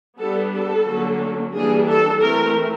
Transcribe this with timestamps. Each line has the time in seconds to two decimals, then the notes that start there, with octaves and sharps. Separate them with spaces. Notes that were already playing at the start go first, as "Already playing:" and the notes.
0.17 G3 B3 D4 A4
0.52 A4
0.85 D3 F#3 A#3 C#4
1.52 E3 G3 A#3 D4 G#4
1.87 A4
2.20 E3 A3 C4 A#4